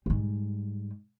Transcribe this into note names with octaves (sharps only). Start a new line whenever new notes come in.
G#2 G3